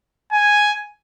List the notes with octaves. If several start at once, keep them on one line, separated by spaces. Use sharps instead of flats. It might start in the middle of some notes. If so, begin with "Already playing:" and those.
G#5